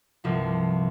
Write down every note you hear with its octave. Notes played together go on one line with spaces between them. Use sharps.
G1 C2 F3